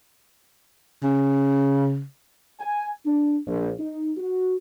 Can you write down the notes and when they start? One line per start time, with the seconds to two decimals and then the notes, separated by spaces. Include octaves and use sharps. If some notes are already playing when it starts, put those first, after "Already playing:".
1.03 C#3
2.59 G#5
3.05 D4
3.46 A#1
3.80 D#4
4.18 F#4